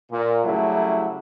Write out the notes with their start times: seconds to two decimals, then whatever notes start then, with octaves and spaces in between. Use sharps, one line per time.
0.12 A#2
0.45 C#3 F#3 G3 A3 E4